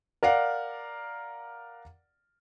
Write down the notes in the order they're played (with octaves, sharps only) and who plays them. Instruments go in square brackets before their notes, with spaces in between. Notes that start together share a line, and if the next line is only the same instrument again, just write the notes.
[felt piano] A#4 D5 F5 F#5